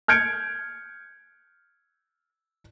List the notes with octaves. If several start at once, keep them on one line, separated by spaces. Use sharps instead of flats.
F6 G6 G#6 C#7 D7